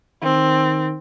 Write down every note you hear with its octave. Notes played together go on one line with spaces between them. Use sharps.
D#3 C4